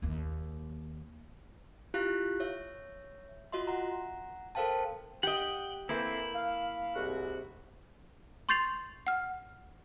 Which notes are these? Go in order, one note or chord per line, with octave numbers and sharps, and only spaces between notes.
D#2 A#3
E4 F4 G4 F5 F#6
C#5 E5
F4 F#4 D#5 E5 C6
F#5 A#5
A4 A#4 C5 F5 G5 A5
G4 D#5 F#5 G5
E3 A3 A#3 C4 E4
F5
C2 G#2 F#4
C6 C#6 G6 A6 C7 F7
F#5 F6